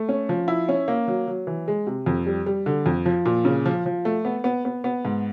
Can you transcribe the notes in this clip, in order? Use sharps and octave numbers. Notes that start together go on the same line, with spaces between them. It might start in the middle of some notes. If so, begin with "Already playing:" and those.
Already playing: A3
C#4
F3
E4
C#4
A#3
F#3
F#3
E3
G#3
C3
F2
G3
G3
D3
F2
F3
A#2
C#3
F3
F3
A3
B3
B3
B3
B3
G#2